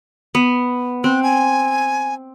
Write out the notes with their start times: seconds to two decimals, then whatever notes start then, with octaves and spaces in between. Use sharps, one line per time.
0.35 B3
1.04 C4 F#6
1.23 G#5